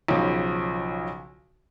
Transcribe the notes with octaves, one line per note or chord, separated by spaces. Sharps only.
B1 C#3 F3